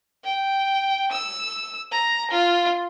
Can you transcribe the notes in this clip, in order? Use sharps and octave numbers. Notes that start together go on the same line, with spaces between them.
G5
E6
A#5
F4